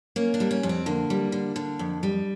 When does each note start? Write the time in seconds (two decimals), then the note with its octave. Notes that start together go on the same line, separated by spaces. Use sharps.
0.16 A#3 C#4
0.34 D4
0.40 G3
0.51 C#4
0.63 F2
0.69 C4
0.86 D3 A#3
1.10 G3
1.32 D3
1.56 D3
1.79 F2
2.03 G3